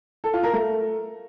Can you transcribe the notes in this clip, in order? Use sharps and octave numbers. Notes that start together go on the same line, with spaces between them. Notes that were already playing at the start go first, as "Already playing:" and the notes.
A4
F4
A#4
A3